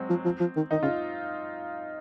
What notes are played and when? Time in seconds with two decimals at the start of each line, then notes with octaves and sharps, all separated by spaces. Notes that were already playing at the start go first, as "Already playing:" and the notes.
Already playing: F#3 G#3 C4
0.10 F3
0.25 F3
0.40 F3
0.56 D#3
0.71 D#3 D#4
0.83 C#3 F4